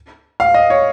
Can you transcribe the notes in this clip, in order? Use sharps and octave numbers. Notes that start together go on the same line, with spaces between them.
F5
D#5
C#5